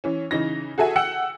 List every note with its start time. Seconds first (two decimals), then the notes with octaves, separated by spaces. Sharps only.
0.04 E3 C#4
0.31 C#3 E3 D#4 A#6
0.78 F#4 G#4 A4 E5 G#5
0.96 F#5 G5 E6 C#7